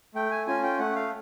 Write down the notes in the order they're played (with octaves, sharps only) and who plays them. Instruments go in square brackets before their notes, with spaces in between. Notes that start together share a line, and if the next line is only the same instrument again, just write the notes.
[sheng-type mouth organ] A3 G5
G#5
C#4 F4 G#5
G5
A3 F#5
F5